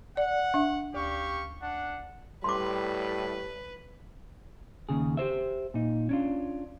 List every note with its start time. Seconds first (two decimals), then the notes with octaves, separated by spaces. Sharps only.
0.17 D5 F#5
0.54 D4 E5
0.94 D2 G4 F5 C#6
1.61 D4 F#5
2.44 A2 G3 B4 C6 D6
4.89 D#2 C#3 G#4
5.17 G4 G#4 C5 E5
5.74 A#2 D#4
6.09 C#4 D4 F4